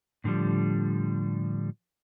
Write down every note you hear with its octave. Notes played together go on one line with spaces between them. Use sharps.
A2 D3 D#3 F3 G3